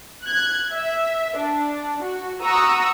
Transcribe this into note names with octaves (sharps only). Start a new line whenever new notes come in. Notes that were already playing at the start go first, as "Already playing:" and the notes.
F#6 G#6
E5
D4
F#4
F#5 A#5 C#6 D#6 E6